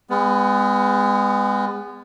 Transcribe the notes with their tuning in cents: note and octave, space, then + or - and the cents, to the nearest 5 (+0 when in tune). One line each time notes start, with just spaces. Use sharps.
G#3 -30 B3 +20